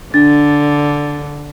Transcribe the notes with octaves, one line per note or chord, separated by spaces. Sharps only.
D3 D4 A6